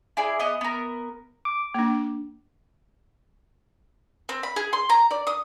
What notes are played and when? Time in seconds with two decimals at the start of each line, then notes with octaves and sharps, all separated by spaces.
0.17 E4 G#4 D5
0.40 B3 D#5
0.61 B3 A#4
1.45 D6
1.74 A#3 D4
4.29 C4
4.43 B5
4.56 G#4
4.73 C6
4.90 A#5
5.11 D5
5.27 D#6